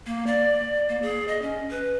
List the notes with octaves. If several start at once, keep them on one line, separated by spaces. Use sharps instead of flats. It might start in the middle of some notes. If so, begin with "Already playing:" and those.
A#3
D5
A#3
G#4
D#5
C#4
B4